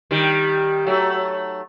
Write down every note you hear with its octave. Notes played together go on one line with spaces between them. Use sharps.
D#3 G3
F#3 A3